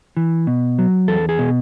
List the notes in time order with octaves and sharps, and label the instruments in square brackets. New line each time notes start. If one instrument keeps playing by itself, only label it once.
[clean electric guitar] E3
B2
F#3
E2 A4
G#4
B2